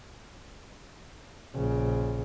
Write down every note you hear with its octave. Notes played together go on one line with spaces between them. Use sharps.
A#1 C#3